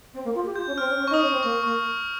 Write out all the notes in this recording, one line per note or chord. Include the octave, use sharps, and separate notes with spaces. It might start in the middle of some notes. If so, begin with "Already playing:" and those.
C4
A#3
F4
G4
F4 G6
C#4
C4 F6
C#4
C#4
D#4 C#6
D#6
C#4
C#6
C4
A#3 C#6
A#3 C#6